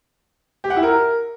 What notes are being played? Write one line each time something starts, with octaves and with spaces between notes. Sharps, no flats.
G4
F#5
E4
A#4